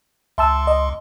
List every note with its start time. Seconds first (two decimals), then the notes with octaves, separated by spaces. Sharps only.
0.38 C#2 E5 A5 C6 E6
0.67 D#5